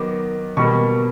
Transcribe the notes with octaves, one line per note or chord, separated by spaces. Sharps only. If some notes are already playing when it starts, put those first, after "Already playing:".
Already playing: D#3 F#3 B3 D6
B2 G3 A#3 C#6